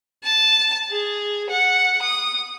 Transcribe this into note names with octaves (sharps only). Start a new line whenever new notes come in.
A5
G#4
F#5
D#6